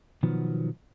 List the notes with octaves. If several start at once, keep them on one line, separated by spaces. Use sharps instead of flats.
B2 D#3 F3 F#3 B3